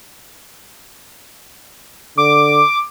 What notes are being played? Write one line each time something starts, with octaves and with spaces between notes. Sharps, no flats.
D3 D6